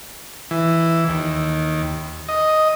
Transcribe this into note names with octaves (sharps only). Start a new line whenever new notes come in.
E3
D#2
D#5